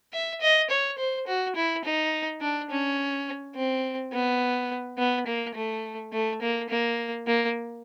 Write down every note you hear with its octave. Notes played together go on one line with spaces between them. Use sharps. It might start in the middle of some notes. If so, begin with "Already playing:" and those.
E5
D#5
C#5
C5
F#4
E4
D#4
D4
C#4
C4
B3
B3
A#3
A3
A3
A#3
A#3
A#3